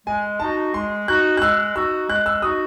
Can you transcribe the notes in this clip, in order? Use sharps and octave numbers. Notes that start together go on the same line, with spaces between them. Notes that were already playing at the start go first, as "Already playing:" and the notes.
G#3 G#5
D#4 F#4 A5
G#3 C6
D#4 F#4 F#6
F#6
G#3 E6
D#4 F#4 E6
G#3 F#6
E6
D#4 F#4 D#6